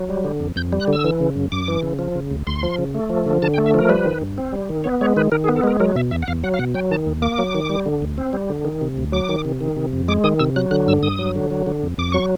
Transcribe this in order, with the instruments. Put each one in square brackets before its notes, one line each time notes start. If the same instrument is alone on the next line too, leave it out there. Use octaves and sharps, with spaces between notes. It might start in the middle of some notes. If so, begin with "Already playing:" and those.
Already playing: [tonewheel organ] F#3
G3
D3
F2
F2 G6
G3
F#6
D3
E6
E3
C#3
F#2
F#2 D6
E3
C#3
F3
C#3
D2
D2 C6
F3
C#3
A3
F3
D3
D3 A5
G5
A3
E5
F3 A#4
G3 B4
D#3
G2
C4
G3
D#3
B3 C#5
G#3 C#5
D#3 B4
D#3 A#4
G#4
B3
A4
G#3 A#4
F#3 A#4
B2 E5
E2 E5
F#5
E2 F5
F#3 F#5
F5
B2 F#5
F#3 G5
D#3 A5
D#2
A#3 D6
F#3
D#3
G3
D3
D2
C4
G3
D3
D#3
C3
D2
F#3 D6
D#3
C3
D#3
C3
F2
G#3 D6
D#3 D#6
C3 E6
F#3 F#6
D3 F#6
G2 E6
G2 D#6
F#3
D3
F#3
D3
F2
F2 D6
F#3 C#6